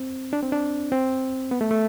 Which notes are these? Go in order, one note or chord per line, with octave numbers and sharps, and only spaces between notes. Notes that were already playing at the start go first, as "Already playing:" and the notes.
Already playing: C4
D4
C4
D4
C4
B3
A3
A3